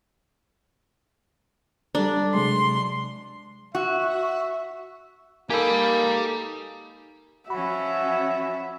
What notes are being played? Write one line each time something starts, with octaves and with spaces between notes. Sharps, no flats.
G3 D4 A4 A#5
C3 F#3 G#3 C6
F#4 E5
A#3 D#4 G4 A4 G#5 B5
F3 C#4 F#4 E5 B5